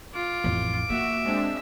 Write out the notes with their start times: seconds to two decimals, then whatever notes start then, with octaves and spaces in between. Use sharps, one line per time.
0.14 F4 D6
0.44 A1 F2
0.90 A#3 F#4 E5
1.23 G#3 C4 D4